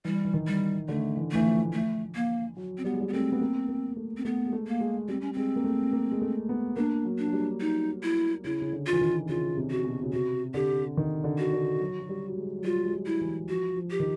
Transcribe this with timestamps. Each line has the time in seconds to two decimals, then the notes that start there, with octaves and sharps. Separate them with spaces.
0.05 E3 G3
0.25 E3
0.34 D#3
0.47 G3
0.88 D3 A3
1.17 E3
1.31 E3 A3
1.45 F3
1.73 A3
2.15 A#3
2.57 F#3
2.78 C4
2.84 G3 B3
2.94 G#3
3.01 G3
3.08 B3
3.13 A3 C4
3.32 B3
3.41 A#3
3.68 A#3
3.96 A3
4.17 C4
4.25 A3 B3
4.46 G#3
4.53 A3
4.67 A#3
4.80 G#3
5.08 G3 C4
5.21 C#4
5.33 G#3 C4
5.56 A#3
5.64 A3
5.93 A#3
6.11 G#3
6.21 A3
6.49 B3
6.76 A#3 D4
7.05 F#3
7.19 D4
7.28 F#3
7.33 G3
7.61 D#4
8.03 E4
8.44 C#3 E4
8.61 C#3
8.73 D3
8.87 F4
8.92 E3
9.01 D#3
9.29 C#3 F4
9.57 C3
9.71 F#4
9.84 B2
10.03 C#3
10.13 C3 F#4
10.54 D3 G4
10.97 D#3
11.24 D3
11.38 F#4
11.53 D3
11.81 F#3
12.00 F#3
12.09 G3
12.37 G#3
12.59 F#3
12.64 G3 F4
12.84 G#3
12.92 G3
13.06 E4
13.21 E3
13.48 F3 F#4
13.76 F3
13.91 G4
14.00 D#3